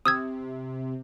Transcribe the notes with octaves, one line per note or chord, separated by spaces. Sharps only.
C3 D#6 E6 G#6